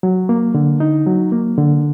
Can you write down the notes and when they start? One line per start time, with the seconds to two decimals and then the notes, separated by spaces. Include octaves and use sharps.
0.03 F#3
0.29 A#3
0.54 D3
0.80 D#4
1.06 F#3
1.32 A#3
1.58 D3